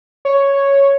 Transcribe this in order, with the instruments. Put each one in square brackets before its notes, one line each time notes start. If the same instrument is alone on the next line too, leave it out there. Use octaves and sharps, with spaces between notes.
[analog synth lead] C#5